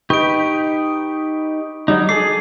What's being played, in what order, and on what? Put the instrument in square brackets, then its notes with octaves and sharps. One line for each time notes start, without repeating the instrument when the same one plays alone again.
[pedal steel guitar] D#4 G4 B4 [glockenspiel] C#6 D7
[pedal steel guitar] F#3 G3 D#4
[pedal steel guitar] G#4 A4 D6 [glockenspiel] C7